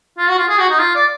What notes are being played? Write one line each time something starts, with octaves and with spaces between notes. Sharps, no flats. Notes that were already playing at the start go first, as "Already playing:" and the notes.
F4
F#4
F4
G#4
F#4
D#4
F4
D5